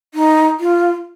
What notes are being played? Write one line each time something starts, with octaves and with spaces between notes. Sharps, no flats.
D#4
F4